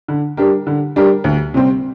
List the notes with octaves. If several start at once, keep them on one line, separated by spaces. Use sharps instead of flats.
D3
G3 D4 G4 A#4
D3
G3 D4 G4 A#4
D2
C3 G3 C4